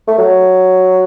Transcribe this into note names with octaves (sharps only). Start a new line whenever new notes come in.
A3
F#3